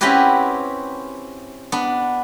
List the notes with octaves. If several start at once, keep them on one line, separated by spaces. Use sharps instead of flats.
C4 C#4 E4 F#4 G4 B4
B3 D4